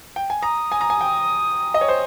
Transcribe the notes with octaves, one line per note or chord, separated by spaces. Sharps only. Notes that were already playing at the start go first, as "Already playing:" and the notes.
G5
G#5
A#5 D#6
G#5
A#5
G#5
G5
D#5
C#5
C5